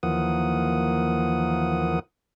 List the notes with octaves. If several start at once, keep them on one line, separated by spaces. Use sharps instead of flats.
D#2 E3 F3 A#3 F#5 D#6